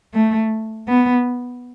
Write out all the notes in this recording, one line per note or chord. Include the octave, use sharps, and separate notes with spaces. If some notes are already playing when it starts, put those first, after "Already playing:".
A3
B3